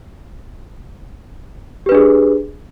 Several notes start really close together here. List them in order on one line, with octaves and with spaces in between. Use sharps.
G4 B4 D4 G#4